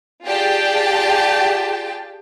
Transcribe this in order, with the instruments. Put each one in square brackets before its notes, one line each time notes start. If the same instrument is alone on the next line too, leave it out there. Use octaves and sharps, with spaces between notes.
[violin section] F4 G4 G#4 D5 G5 A5